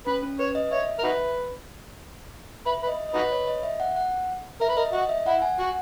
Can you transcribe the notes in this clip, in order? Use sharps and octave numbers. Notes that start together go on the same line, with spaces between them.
C#4 B4
C#4
B4 C#5
D#5
C#5 E5
A#4
D#4 F#4 B4
B4 E5
B4
D#5
D#5
D#4 F#4 B4
C#5
D#5
E5
F#5
F#5
A#4 E5
B4
A#4 D#5
F#4 D#5
E5
E4 F#5
G#5
F#4 F#5